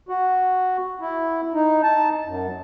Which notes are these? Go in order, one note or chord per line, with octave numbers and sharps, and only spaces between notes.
F#4
E4
D#4
A5
F#2